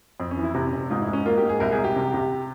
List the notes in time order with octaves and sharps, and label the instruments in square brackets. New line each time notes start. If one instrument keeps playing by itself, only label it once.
[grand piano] F2 [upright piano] C4
[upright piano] C#4
[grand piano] E3
[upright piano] E4
[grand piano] C3 [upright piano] E4
[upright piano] C#4
[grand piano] F1
[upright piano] C4
[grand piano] G#2 [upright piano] F4
[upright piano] E4
[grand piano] G#2
[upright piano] C#4
[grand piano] A#3 [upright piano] F4
[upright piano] G4
[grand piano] G#2
[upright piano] G#4
[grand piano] C2 [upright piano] A#4
[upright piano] G#4
[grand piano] C2
[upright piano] G4
[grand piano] C3
C3